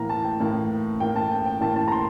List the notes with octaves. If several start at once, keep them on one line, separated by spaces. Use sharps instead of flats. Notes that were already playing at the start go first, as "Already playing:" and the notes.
Already playing: A2 E3 A#3 A#5
A5
G5
A2 E3 A#3
A2 E3 A#3 G5
A5
G5
G5
A2 E3 A#3 A5
A5
A#5
C6